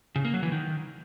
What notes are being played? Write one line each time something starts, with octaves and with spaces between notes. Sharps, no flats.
C#3
A#3
F#3
E3
D#3